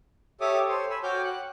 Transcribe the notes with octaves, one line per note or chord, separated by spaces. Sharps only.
G4 A4 C#5 E5 D6 D#6
A4 C5 C#5 C6
G#5 B5 E6
F#4 C#5 G5 D6 F6 G6
F#5 F#6